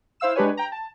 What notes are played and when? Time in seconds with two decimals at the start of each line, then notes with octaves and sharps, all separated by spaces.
0.20 E4 C5 F5 E6 E7
0.36 G#3 D4 G4 B4 C#5 G#5
0.57 G5 A#5
0.72 A5